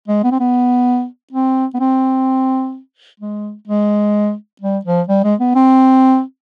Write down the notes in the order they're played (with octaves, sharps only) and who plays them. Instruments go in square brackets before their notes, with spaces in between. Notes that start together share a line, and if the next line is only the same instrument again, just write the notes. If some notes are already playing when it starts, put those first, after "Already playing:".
[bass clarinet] G#3
B3
C4
B3
C4
B3
C4
G#3
G#3
G3
F3
G3
G#3
B3
C4